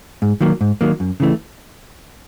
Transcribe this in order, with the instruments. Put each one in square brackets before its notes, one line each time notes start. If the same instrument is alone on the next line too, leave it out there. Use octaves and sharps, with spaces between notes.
[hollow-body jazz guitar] G#2
D#3 F#3 A#3
G#2
D#3 F#3 A#3
F#2
C#3 E3 A3